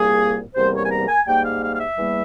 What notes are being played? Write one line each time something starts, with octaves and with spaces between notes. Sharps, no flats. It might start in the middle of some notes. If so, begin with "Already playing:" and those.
Already playing: C2 A#2 G3 A#3 G#4
E2 C3 G3 A#3 C5
C#5
G#5
A#5
G#5
G#2 G3 A#3 G5
F5
F5
F5
E5
E2 E3 G3 A#3